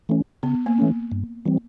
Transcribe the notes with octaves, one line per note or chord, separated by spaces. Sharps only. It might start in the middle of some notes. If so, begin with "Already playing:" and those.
E3 A3 C#4
C#3 B3
A#3
E3 A3 C#4
G2
E3 G3 C4